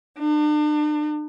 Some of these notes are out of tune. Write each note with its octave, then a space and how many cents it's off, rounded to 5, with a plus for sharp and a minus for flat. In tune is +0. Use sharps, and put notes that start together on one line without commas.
D4 +40